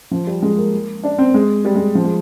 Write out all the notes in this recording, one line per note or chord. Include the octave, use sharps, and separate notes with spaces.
F3
G3
G#3
A#3
D4
C4
G#3
G3
G#3
F3
G#3